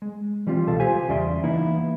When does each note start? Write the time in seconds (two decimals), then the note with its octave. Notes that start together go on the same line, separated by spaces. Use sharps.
0.02 G#3
0.47 E3 G3 C4 F4
0.67 C#2 B2 A4 F5
0.80 F4 G4 C5 G#5
1.09 E2 C#3 G3 D5 E5 C6
1.44 E3 A#3 B3 D#4 E4